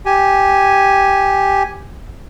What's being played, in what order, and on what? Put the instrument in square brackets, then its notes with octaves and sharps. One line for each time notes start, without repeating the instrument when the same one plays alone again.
[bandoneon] G4 G#5